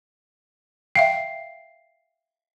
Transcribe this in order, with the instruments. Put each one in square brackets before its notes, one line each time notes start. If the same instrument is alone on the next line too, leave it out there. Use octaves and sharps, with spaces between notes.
[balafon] E5 F5 G5 [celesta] C7